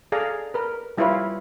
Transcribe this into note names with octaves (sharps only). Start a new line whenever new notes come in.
G#4 A4 D5 F5 A#5
A#4 B4
G3 E4 F4 B4 C#5 F5